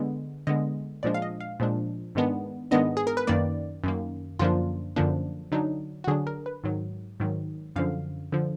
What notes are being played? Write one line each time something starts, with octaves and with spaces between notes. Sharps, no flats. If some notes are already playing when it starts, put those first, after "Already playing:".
Already playing: D3 G#3 B3
D3 G#3 B3 D#5
A#2 F3 G#3 D4 D5
F5
D#5
F5
A#2 F3 G#3 D4
G#2 D#3 G#3 B3 D4
G#2 D#3 G#3 B3 D4 D#5
G#4
A#4
B4
F#2 D#3 A#3 D5
F#2 D#3 A#3
F#2 D3 F3 A#3 D4 F4
F#2 D3 F3 A#3 D4
D3 F#3 D4 D#4
F#4
D3 F#3 D4 G#4
A#4
B4
G#2 D#3 F#3
G#2 D#3 F#3
F#2 D3 F3 F5
D3 F3